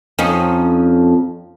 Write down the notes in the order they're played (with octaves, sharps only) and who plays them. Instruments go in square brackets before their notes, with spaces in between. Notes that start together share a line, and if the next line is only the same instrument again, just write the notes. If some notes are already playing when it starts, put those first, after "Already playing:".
[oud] F2 C#4 D#4